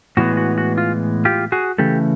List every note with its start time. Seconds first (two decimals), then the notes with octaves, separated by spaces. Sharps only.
0.17 A2 E3 G#3 B3 F#4
0.37 F#4
0.58 F#4
0.78 F4
1.25 F4 G4
1.52 F#4 G#4
1.78 C#3 E3 A3 G4 A4